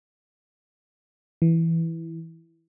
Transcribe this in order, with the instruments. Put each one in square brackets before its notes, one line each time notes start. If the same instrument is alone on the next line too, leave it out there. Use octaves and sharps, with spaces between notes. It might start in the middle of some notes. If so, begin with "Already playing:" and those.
[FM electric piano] E3